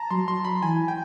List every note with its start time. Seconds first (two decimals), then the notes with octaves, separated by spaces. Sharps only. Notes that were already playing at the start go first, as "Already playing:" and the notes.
Already playing: A5 A#5
0.10 F#3 C6
0.28 C6
0.45 B5
0.62 E3 G#5
0.88 G5